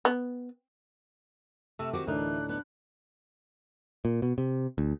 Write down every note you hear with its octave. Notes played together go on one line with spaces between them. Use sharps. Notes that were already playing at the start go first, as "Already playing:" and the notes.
B3
C3 A3 E6
D#3 C4 F#4 G4 D6
D2 A2 E3 D4 D#4 A#4 F#6
B3 F#6
A#2
B2
C3
D2